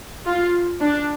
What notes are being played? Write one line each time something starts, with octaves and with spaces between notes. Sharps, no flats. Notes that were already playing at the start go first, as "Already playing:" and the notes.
F4
D4